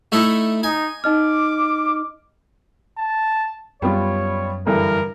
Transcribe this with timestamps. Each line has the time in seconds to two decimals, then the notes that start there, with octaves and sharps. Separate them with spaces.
0.12 A3 D#4 E4
0.63 D#4 G#5
1.04 D#4 D#5 D6 F6
2.98 A5
3.82 F#2 G3 B3 F4 C#5
4.67 G2 D3 E3 A#4